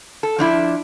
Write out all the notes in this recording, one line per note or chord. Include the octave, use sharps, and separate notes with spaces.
A4
F3 D4 E4